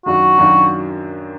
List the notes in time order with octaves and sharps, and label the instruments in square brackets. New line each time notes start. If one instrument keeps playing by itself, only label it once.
[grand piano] F#2 D#3 F#3 D4 F4 [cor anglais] F#4
[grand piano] F#2 D#3 F#3 D4 F4